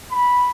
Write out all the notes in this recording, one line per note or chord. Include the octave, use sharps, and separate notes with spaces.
B5